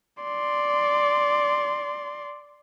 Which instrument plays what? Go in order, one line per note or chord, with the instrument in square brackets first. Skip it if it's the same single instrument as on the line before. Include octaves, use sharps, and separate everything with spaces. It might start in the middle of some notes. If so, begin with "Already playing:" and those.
[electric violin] D5 C6